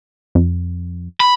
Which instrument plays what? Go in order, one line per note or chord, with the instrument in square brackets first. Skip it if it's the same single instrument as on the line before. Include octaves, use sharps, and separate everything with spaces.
[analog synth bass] F2
[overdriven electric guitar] B5